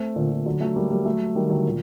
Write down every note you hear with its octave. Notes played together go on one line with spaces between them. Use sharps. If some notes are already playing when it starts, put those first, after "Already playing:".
Already playing: A3 C4
A#2 D3
A#2
D3 F#3
F#3 A3
G3 A#3
G3 A#3
F#3 A3
D#3 G3
D3 F#3
A#2